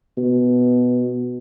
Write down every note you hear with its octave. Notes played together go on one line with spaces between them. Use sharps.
B2